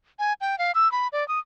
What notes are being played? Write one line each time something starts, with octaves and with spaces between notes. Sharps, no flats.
G#5
G5
F5
E6
B5
D5
D#6